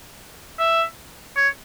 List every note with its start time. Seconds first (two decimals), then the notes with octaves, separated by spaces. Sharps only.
0.59 E5
1.37 C#5